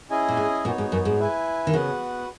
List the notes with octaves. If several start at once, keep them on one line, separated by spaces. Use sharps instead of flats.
C#4 E4 G#4 D#5 G#5
A#2
G#2
A#2 B3 D#4 F#4 C#5
G#2
F#2
G#2
E4 B4 E5 G#5
D#3
C#3 B3 F#4 B4 F#5